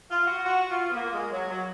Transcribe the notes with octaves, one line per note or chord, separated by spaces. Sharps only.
F4
F#4
F#4
F4
B3
A#3
G#3
F#3
F#3